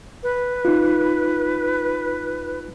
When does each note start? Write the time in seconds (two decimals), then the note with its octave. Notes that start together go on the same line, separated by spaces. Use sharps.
0.23 B4
0.65 D#4 F4